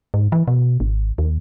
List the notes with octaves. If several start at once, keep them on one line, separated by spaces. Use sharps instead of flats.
G#2
E3
B2
G#1
D#2